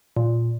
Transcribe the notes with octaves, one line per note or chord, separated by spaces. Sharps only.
A#2